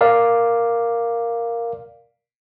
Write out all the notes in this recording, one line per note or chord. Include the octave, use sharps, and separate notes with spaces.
A#4 D5 F5